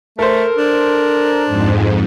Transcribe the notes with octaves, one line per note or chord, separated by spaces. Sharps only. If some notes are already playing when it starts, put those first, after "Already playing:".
A3 A4 A#4 C5
D4
F2 G#2